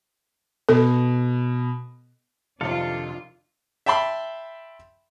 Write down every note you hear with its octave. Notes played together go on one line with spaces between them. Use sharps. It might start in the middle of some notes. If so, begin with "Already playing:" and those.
B2 A4
F2 C3 D#3 D4 F4 A4 F5
E5 G5 A5 B5 C6